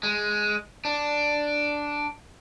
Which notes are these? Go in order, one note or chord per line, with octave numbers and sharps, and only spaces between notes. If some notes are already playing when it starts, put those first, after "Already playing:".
G#3
D4